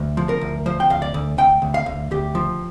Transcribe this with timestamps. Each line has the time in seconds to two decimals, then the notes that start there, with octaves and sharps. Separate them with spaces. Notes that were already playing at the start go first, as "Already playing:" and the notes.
Already playing: D2
0.17 F3
0.29 A#4
0.41 D2
0.66 F3 C5
0.80 G5
0.90 D2 F5
1.02 D5
1.14 D2
1.38 D2 G5
1.62 D2
1.74 F5
1.86 D2
2.11 D2 G4
2.35 F3